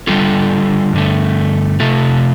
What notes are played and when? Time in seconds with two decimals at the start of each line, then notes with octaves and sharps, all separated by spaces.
0.07 D3 G3 F4 A4
0.93 G2 D3 A3
1.80 C3 A3 F4 A4